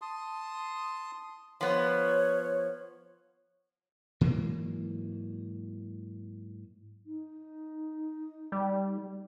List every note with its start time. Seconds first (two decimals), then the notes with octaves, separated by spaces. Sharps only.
0.02 A5 C6 D#6
1.61 F3 B3 C#5
4.21 G#2 E3 F#3 A#3
7.05 D#4
8.52 G3